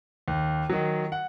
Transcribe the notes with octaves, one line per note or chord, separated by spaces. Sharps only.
D#2
D#3 F#3
F#5